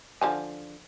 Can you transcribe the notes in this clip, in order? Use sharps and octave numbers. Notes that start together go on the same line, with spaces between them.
D3 F3 G#5